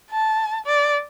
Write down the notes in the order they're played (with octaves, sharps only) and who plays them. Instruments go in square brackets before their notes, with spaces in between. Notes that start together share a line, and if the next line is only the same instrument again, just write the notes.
[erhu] A5
D5